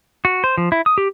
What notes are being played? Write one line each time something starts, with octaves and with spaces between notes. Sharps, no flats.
F#4
C5
F3
E4
D#6
G4